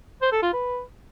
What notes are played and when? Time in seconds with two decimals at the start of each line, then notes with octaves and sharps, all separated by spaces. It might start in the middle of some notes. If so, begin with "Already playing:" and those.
0.22 C5
0.32 A4
0.43 F4
0.53 B4